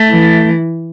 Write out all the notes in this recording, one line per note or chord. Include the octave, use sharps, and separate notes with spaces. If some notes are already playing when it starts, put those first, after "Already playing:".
Already playing: A3
E3